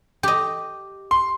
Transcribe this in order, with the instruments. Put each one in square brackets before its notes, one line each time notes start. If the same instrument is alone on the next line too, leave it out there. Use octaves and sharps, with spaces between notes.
[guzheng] G4 D#5
[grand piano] C6